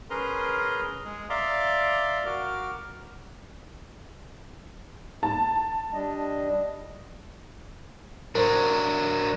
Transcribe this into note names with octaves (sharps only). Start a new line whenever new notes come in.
C#4 G#4 A#4 B4 A#5 C6
G#3 G#4
D5 E5 F5 A#5 C6 D6
F#4 A#4 D6 F6
A5 A#5
G3 D4 D#5
F#3 D4 A#4 C5